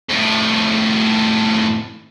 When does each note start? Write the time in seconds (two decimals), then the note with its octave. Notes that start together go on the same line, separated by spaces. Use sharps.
0.09 F2 A2